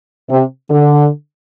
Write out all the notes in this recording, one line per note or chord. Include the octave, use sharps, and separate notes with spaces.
C3
D3